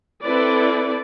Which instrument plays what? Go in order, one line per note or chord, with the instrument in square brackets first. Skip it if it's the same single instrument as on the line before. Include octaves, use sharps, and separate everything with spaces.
[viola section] C4 E4 A4 B4 D5